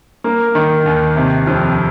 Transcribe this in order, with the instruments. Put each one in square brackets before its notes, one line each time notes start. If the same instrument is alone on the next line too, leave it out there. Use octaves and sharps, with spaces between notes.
[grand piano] A#3
D#3
D#2
C3
F2